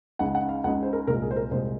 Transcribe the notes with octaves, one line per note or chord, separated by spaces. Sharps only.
C#2 C#3 G#3 D#4 F#5
F#5
F5
C#2 C#3 G#3 D#4 F#5
C5
A#4
C2 A#2 G#3 A#4
G#4
C5
A#4
C2 A#2 G#3 C5